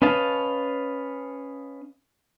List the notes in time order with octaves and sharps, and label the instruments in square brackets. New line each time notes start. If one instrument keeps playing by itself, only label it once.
[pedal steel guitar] C#4 B4 D#5 F5 A5